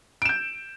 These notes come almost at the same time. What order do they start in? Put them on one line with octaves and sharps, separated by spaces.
D7 E7 G6